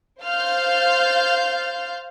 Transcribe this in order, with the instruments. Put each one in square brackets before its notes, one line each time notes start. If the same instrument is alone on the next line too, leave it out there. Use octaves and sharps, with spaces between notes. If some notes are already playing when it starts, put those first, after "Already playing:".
[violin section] C5 F5 C6 F6 G6 A6